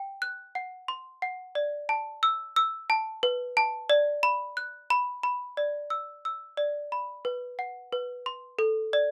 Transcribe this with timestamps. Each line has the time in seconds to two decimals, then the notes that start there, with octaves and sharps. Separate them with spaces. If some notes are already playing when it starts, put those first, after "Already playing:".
Already playing: G5
0.22 F#6
0.55 F#5
0.88 C6
1.22 F#5
1.55 D5
1.89 A5
2.23 E6
2.56 E6
2.90 A5
3.23 B4
3.57 A5
3.90 D5
4.23 B5
4.57 F#6
4.90 B5
5.23 B5
5.57 D5
5.90 E6
6.25 E6
6.57 D5
6.92 B5
7.25 B4
7.59 F#5
7.93 B4
8.26 C6
8.59 A4
8.93 D5